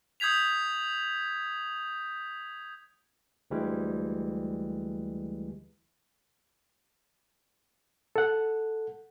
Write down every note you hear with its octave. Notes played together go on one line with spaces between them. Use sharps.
D#6 G6 G#6 B6 F7
D2 E3 G3 G#3
A4 F#5